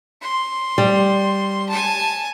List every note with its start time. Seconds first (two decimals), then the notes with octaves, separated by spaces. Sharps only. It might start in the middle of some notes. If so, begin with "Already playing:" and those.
0.22 C6
0.78 G3
1.69 G#5 A5